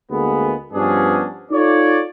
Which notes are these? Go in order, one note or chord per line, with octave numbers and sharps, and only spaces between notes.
D2 G#3 A#3 B3
G2 F3 B3 C#4 D4 G#4
D#4 F4 A4 C#5 D5